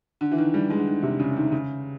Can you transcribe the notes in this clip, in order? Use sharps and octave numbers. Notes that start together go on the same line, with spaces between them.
D3
E3
D#3
G3
G#3
D3
D#3
C3
C#3
D#3
C#3